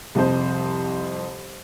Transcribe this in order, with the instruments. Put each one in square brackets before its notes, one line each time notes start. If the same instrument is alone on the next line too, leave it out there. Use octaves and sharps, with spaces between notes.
[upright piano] C2 F2 C5